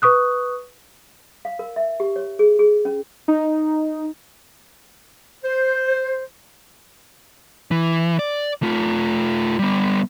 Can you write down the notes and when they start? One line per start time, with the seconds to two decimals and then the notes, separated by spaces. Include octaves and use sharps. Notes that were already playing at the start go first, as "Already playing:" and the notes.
0.02 B4 C#6 D#6 F#6
1.45 F5
1.59 A#4
1.76 E5
2.00 G4
2.16 C#5
2.39 G#4
2.59 G#4
2.85 C#4
3.28 D#4
5.44 C5
7.71 E3
8.19 D5
8.63 A3 F4
9.59 G3 B3